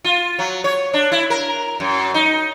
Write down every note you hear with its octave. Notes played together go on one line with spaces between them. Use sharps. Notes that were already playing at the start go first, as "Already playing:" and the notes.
F4
F#3
C#5
D4
E4
A#4
F#2
D#4